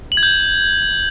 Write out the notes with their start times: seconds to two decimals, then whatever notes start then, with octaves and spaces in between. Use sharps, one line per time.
0.12 F#7
0.17 G#6
0.23 G6